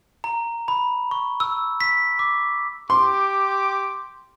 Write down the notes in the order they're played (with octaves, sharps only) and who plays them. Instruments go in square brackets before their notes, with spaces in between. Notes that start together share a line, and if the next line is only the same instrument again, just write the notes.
[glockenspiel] A#5
B5
C#6
E6
B6
D6
[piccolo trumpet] G4 [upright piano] C6 [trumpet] D6